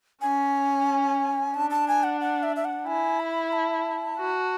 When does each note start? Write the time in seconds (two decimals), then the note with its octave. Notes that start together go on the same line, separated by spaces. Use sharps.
0.21 C#4 G#5
1.54 D4 A5
1.70 A5
1.88 G#5
2.04 F#5
2.21 F#5
2.43 E5
2.56 E5
2.65 F#5
2.87 E4 G#5
3.20 B5
3.53 A5
4.19 F#4